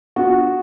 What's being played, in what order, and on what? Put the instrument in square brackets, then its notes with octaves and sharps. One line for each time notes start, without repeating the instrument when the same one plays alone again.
[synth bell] B3 D4 F4 [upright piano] F#4